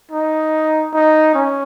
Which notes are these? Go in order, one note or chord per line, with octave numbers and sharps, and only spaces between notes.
D#4
D#4
C#4